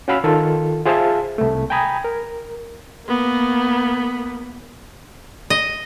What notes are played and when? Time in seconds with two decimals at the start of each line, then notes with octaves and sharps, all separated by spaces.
0.08 C#4 F#4 F5 B5 E6 F6
0.24 D#3 F4 A4
0.86 F4 G#4 C5 E5 F5 A5
1.38 C2 A3
1.70 G5 G#5 A#5 B5 D#6 G#6
2.04 A#4
3.07 A#3 B3
5.50 D#5